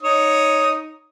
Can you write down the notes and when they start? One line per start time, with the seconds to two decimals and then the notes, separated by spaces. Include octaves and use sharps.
0.03 D#4 C#5 D#6